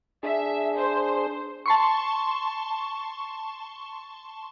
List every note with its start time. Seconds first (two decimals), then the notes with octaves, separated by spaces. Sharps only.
0.23 D4 G#4 E5
0.76 C5
1.66 A5 C6 C#6